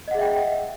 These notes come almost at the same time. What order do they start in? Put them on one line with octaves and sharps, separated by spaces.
D#5 F#5 G#4 E5 G5